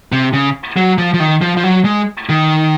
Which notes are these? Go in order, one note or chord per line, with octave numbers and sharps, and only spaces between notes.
C3
C#3
F#3
F3
F3
D#3
F3
F3
F#3
G#3
D#3